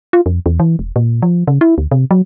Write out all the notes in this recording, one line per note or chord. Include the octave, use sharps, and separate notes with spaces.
F4
F2
E2
E3
E1
A#2
F3
C#3
E4
D2
C3
F#3